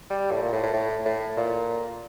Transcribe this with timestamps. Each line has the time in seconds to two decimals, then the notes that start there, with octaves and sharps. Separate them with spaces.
0.10 G3
0.31 A2
0.41 A#2
0.52 A2
0.63 A2
0.73 A2
1.05 A2
1.37 A#2